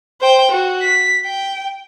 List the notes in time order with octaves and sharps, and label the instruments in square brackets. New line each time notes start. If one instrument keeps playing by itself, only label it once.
[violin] C5 G5
F#4
B6
G5